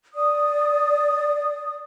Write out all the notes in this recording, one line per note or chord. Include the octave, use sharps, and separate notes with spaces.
D5 D#6